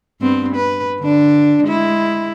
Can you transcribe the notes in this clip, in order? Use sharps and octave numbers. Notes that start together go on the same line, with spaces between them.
G2 B3 C4
B4
D3 D4
G#3 E4